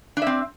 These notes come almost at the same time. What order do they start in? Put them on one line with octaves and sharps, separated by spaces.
D4 E5 C4